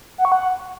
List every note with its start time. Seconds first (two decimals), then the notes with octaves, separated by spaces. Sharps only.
0.18 F#5
0.25 C#6
0.32 F#5